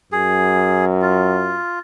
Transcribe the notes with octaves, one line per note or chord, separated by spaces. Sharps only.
F#2 G#4
F4